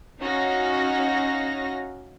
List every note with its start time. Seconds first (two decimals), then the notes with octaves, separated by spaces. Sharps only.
0.21 C#4 D#4 F#4 F5 A#6